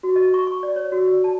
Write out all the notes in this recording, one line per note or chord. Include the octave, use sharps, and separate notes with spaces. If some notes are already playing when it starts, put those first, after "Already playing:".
F#4
D#5
C#6
C#6
D5
C#5
F#4
D5
A5